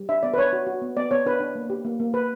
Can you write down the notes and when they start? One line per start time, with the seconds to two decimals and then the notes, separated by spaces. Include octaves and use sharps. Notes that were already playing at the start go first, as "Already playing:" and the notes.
Already playing: G3
0.09 D4 E5
0.23 B3 D5
0.34 B4
0.38 D4 C#5
0.53 F#4
0.67 F#4
0.82 B3
0.97 B3 D5
1.11 B3 C#5
1.26 D4 B4
1.40 D4
1.55 A#3
1.70 G4
1.85 A#3
2.00 A#3
2.14 A#3 B4